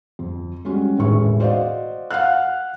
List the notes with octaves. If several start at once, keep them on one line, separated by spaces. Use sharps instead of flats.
F2
G3 G#3 C#4 F#4
E1 A1 A2 D#3 G#4 C#6
F#4 C5 D5 D#5 F5
F5 F#5 F6 F#6